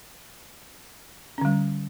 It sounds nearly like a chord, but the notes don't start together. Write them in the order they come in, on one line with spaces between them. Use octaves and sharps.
C#4 D3 G3